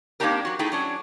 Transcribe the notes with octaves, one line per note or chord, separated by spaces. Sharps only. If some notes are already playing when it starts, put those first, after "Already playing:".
A#3 C4 D4 D#4 G4 A#4
F#3 F#4
A3 D#4 E4 G#4 G5
F#3 C#4 D4